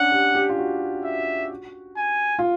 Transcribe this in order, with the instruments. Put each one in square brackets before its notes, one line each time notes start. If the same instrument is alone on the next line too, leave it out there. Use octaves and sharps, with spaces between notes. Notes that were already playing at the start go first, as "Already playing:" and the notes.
Already playing: [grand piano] C#4 D4 [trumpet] F#5
[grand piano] G4
G4
F4
F#4
[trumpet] E5
G#5
[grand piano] F4